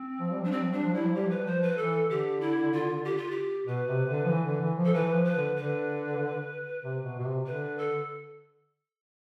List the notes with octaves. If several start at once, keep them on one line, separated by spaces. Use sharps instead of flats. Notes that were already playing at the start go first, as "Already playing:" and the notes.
Already playing: C4
F3
G3
F3 D4
G3 C4
F3
G3 D4
F3
G3 E4
F3
G3 G4
F3
B4
G3
F3 C5
B4
E3 A4
D3 G4
E4
F4
G4
F4
G4
B2 B4
C3
D3
F3
E3
D3
E3
F3
A4
E3 B4
E3
F3
B4
D3
D3 B4
C3
B2
B2
C3
D3 B4
A4